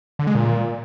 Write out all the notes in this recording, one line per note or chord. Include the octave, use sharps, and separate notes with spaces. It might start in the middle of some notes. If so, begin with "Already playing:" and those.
D3
G#3
A#2